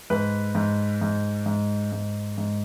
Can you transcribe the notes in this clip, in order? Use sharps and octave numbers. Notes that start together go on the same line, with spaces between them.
G#2 B4
G#2
G#2
G#2
G#2
G#2